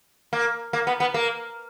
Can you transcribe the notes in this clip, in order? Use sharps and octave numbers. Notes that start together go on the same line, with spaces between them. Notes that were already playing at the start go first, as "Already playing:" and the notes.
A#3
A#3
B3
B3
A#3